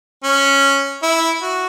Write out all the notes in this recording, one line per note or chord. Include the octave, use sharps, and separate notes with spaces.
C#4
E4
F#4